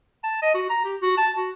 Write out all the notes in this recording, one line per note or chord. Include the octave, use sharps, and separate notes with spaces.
A5
D#5
F#4
A#5
G4
F#4
A5
F#4